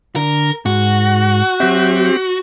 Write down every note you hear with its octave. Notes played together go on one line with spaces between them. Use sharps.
D3 A#4
G#2 F#4
F#3 C4 G4 E5